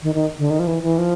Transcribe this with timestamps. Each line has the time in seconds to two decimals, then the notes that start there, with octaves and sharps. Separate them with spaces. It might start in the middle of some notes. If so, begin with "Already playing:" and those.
0.03 D#3
0.15 D#3
0.38 D3
0.50 D#3
0.59 F3
0.67 E3
0.83 E3
0.98 F3